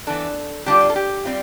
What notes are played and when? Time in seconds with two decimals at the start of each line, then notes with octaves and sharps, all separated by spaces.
0.07 E3 B3 D4 A4
0.66 D3 G3 D4 F4 G4
0.80 F4
0.89 A4
0.96 G4
1.25 G3 C4 F4